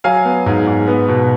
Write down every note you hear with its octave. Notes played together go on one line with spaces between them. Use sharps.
F#3 F5 G#5
B3
G#2
G#2
B3
B2